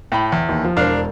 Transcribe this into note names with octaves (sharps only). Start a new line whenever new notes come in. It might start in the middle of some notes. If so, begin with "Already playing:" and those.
A2 G5 B5
E2
D#2
F3
E1 D4 A#4 C5 F5